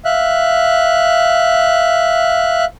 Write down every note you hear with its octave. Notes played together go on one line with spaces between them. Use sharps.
E5 F5 F#6